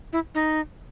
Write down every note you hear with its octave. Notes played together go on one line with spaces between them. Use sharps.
E4
D#4